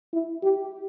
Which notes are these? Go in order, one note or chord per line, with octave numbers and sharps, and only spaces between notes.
E4
G4